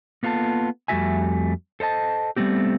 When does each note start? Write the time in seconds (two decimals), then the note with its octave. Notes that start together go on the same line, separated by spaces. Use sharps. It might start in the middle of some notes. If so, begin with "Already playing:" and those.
0.23 A#3 B3 F4 A4 A5
0.88 F2 G3 A3 F#4 E5 G#5
1.80 A4 C5 D#5 A5
2.37 G3 A3 B3 C4 G4